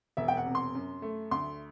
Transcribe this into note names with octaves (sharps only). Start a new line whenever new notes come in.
E1 E5
G5
F#5
C3
C6
F#2
A3
D2 C6